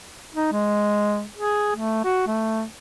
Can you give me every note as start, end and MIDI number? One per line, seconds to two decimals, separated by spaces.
0.35 0.51 63
0.52 1.25 56
1.37 1.75 68
1.76 2.03 57
2.05 2.23 66
2.27 2.64 57